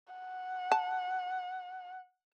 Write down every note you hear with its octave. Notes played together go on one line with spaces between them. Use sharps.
F#5
A5